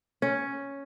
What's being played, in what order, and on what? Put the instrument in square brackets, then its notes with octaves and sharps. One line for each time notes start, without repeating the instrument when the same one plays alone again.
[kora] C#4